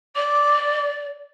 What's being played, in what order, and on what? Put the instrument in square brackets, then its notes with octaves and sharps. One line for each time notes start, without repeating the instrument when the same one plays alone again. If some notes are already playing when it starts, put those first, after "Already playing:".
[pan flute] D5 [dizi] D6